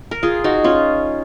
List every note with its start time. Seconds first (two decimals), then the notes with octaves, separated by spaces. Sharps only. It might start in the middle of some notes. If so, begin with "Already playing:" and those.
0.11 A#4
0.23 F4 G#4
0.44 D#4 F#4
0.64 C#4 F4